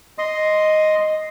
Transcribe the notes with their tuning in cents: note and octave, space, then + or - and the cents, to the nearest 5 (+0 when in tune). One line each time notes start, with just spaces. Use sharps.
D#5 +0 C6 +0